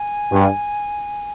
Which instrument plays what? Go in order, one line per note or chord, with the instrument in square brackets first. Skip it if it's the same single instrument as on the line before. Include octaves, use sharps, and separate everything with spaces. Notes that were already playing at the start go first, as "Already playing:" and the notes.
Already playing: [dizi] G#5
[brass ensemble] G2